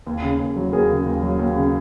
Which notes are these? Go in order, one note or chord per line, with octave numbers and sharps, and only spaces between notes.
D#2
C#3
D#2
F#3
D#2 G#4 A#4
C#3
D#2
F#3
D#2
C#3